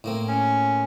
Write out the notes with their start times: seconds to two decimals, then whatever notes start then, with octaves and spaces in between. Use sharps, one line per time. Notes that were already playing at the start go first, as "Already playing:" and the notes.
0.04 A2 A#3 C4
0.28 C#4